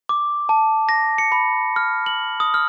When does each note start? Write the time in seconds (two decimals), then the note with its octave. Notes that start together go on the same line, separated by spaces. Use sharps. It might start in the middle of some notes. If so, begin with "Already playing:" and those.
0.09 D6
0.49 A5
0.89 A#6
1.18 C#7
1.32 B5
1.76 F6
2.06 F#7
2.40 D#6
2.54 F6